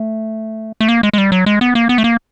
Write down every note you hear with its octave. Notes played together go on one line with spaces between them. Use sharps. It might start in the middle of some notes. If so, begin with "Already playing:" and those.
Already playing: A3
A3
A#3
G#3
G#3
G3
F#3
G#3
B3
A#3
B3
A3
A#3